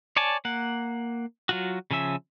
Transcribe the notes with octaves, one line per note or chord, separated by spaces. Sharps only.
C#5 D5 G#5 A5
A#3 F#5
F#3 F4 F#4
C#3 F3 C#4 E5